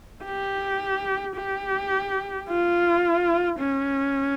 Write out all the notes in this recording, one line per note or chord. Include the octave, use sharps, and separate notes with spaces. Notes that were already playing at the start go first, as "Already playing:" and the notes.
G4
G4
F4
C#4